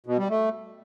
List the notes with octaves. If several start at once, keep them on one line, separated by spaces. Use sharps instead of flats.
B2
G3
A3